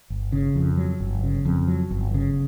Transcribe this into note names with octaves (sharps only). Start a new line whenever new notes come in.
G1
C#3
F2
F#3
G1
C#3
F2
F#3
G1
C#3